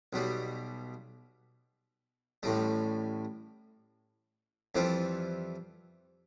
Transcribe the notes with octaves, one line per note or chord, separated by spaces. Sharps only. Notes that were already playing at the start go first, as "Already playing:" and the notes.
B1 B2 G3
A1 A2 G3
F2 E3 G3 C4 F4